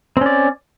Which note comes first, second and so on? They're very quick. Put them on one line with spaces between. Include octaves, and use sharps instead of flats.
C4 C#4 D5